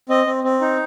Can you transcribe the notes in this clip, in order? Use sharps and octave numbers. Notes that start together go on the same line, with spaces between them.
C4 D#5
C4
C4
D#4